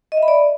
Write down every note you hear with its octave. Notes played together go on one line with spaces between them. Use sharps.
D#5
E5
B5
D5